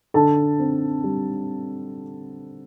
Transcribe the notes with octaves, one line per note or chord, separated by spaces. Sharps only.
D3 A4 A5
C4
G3